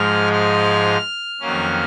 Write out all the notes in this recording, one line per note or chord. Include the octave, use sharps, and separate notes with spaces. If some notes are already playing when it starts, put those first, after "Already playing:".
Already playing: G#2 F3 G#3 F6
F6
F2 D#3 F#3 A#3 C#4